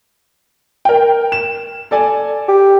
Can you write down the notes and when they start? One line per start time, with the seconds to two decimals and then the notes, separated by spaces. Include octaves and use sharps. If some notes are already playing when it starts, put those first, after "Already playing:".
0.85 A#4 G5
1.32 E7
1.91 A4 D5 G#5
2.48 G4